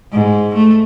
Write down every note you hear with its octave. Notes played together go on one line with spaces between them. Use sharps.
G#2
A3